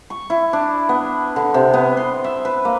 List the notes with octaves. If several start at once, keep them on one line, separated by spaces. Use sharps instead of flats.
C#6
E4
D4
B3
D3
C3
B3
C6
E5
B4
A#3